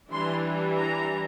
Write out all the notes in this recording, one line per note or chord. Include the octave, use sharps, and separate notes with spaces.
E3 G3 D4 C6
A#5